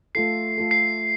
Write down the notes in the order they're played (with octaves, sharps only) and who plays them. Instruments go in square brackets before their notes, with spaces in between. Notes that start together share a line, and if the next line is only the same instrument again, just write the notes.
[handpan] A3 F4 A4 [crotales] C7
[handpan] A3 F4 A4
[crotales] C7